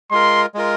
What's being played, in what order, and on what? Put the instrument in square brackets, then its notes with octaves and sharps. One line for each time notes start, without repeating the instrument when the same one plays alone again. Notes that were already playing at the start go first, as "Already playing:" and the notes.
[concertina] G#3 F4 A#4 [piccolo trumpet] C6
[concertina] G#3 F4 A#4